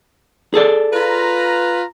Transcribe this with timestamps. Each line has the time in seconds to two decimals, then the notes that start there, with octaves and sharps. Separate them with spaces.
0.54 G#4 A4 D5
0.93 F4 B4 A#5